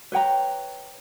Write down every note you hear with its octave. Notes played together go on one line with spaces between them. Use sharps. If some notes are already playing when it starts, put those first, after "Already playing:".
B4 C#5 G5 A#5